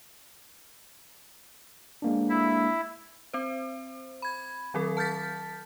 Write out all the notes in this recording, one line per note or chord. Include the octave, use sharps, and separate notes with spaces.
G#3 A#3 D4
E4 E5
C4 C5
B5 G#6
D#3 F#3 C4 A4
A5 F6 G6 A6 B6